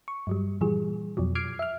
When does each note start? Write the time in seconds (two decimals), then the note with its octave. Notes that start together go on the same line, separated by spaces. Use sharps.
0.08 C#6
0.27 G2 F#3 G3
0.61 A#2 E3 F3 G3 G#4
1.17 F2 B2 F3 F#3
1.35 D6 F6 G#6 C7 D7
1.59 E5 F6